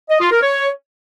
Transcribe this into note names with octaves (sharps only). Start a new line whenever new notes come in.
D#5
F4
A#4
C#5